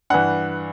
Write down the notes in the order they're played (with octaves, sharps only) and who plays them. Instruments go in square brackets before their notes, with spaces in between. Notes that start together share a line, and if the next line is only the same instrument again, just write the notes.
[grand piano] G2 E3 F#5